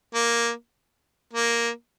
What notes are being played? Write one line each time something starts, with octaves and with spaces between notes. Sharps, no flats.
A#3
A#3